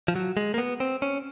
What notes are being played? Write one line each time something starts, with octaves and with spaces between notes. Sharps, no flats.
F3
F#3
G#3
A#3
B3
C4
C#4